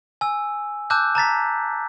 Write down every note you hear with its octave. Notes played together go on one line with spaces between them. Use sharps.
G#5 E6
A5 D6 E6 F#6 G6
A5 A#5 A6 B6